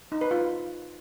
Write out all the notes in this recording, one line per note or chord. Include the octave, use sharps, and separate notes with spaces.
D#4
B4
F4